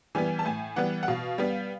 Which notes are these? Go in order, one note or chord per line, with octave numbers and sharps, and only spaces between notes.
E3 G3 B3 G#5
A5
A2 G#5
E3 G3 B3 F#5
F#5
B2 F5
G3 B3